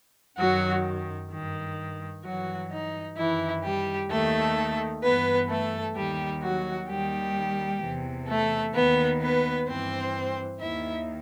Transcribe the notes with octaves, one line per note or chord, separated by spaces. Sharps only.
F#2 D#3 F#3 F#4
G2 D#3
G2 E3 F#3 F#4
D#4
F#2 D#3 E3 E4
G3 G4
D#2 D#3 A3 A4
G2 E3 B3 B4
A3 A4
D#2 D#3 G3 G4
F#3 F#4
D#2 D#3 G3 G4
E2 C3 E3
A3 A4
D#2 D#3 B3 B4
B3 B4
G2 E3 C4 C5
D#2 D#3 E4 E5